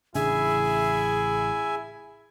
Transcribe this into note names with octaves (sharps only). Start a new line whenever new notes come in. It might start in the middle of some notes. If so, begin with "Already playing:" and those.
A1 C#3 D4 E4 G#4 E5 G#5